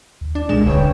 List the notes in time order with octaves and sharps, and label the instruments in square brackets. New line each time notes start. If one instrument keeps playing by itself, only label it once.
[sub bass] D#2
[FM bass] D4
[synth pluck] C2 E7 [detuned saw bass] A#2 [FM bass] G#3
[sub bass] D1 [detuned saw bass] C#2 [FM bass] D3 [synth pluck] B4 C#5 G5